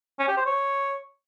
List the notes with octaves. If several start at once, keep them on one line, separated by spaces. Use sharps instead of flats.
C#4
G4
C5
C#5